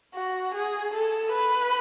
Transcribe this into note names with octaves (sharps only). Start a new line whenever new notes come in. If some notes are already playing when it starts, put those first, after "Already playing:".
F#4
G#4
A4
B4